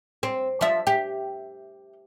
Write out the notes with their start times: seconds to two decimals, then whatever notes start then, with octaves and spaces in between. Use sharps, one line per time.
0.23 C4
0.61 F3 E5
0.87 G4